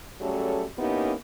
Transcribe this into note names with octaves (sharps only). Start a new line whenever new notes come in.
F#3 G3 A3 C#4 G#4 A4
A#3 B3 C#4 D#4 E4 G4